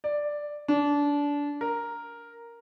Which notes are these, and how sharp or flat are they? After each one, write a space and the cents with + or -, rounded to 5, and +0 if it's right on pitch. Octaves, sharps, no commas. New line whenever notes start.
D5 +5
D4 -25
A#4 +0